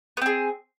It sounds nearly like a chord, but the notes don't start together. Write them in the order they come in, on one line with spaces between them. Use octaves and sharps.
B3 C4 G#4